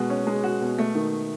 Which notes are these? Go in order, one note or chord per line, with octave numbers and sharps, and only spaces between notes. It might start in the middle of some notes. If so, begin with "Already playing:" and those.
Already playing: B2 G#3 F#4
C#4
G#3
F#4
B2
A3
D#3